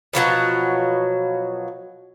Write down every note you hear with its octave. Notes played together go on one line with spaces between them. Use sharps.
B2 F3 F#3 F#5